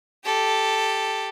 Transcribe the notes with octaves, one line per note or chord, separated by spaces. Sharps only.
G4 A4